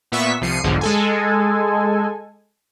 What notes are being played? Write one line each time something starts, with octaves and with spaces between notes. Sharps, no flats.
A#2 B3 E5 C#6 B6
C2 F3 C7 C#7 D#7
B1 E2 G#2 D3 F3
G#3 A4 G#5